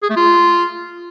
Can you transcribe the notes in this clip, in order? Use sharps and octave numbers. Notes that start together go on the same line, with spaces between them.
G#4
A3
F4